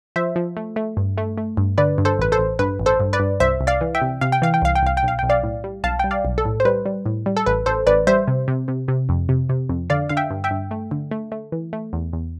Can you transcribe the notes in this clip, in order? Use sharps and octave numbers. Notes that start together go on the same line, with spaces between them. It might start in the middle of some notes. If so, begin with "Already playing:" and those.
F3 C5 E5
F3
A3
A3
G2
A3
A3
G2
D3 B4 D5
G2
A4 C5
A1 B4
A4 C5
A1
G2 B4
A1
A4 C5
G2
B4 D5
G2
C2 C5 E5
C2
D5 F5
E3
E5 G5
C3
C3 F5
G5
E3 F5
G5
C2 F5
G5
C2 F5
G5
B1
F5
B1 G5
D5 F5
A2
G3
B1 F5 A5
G3 G5
D5 F5
B1
A4
A2
C5
G3 B4
G3
A2
G3
A4
A1 B4
A1 A4 C5
A1 B4 D5
G3 C5 E5
C3
C3
C3
C3
F2
C3
C3
F2
D3 D5 F5
D3 F5
E5 G5
G2
E5 G5
G2
A3
D3
A3
A3
E3
A3
E2
E2